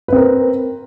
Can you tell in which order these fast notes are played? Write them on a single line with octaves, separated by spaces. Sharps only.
B4 C4 A#4